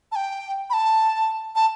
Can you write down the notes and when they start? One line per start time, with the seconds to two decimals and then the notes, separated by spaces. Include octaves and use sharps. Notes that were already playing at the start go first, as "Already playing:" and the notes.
0.12 A5
0.16 G5
0.70 B5
0.73 A5
1.56 A5